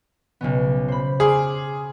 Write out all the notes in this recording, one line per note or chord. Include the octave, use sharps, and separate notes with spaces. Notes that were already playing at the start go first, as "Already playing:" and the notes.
B1 C#3 B3
C5 B5
G#4 C6 D6 F6